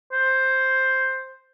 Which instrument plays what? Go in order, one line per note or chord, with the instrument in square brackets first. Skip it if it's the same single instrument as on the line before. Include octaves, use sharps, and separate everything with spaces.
[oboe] C5